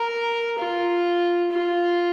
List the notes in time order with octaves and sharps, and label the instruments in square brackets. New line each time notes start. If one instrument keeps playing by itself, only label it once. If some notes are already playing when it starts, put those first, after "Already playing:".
Already playing: [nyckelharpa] A#4
F4
F4